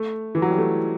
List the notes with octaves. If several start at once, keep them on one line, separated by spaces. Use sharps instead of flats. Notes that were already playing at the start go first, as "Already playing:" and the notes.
Already playing: A3
E3
F#3
G3
A3